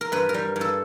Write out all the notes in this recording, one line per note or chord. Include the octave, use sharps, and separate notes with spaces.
A#4
G2 B4
A#4
G3
G2
A4